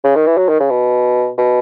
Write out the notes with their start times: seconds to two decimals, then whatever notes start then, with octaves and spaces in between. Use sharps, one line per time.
0.04 C#3
0.16 D#3
0.27 E3
0.37 F#3
0.49 D#3
0.60 C#3
0.70 B2
1.38 B2